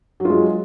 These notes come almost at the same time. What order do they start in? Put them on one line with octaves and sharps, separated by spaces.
F#3 F4 G#3